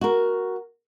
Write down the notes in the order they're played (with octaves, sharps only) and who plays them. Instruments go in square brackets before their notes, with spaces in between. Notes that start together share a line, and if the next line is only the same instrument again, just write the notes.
[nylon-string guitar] F#4 A#4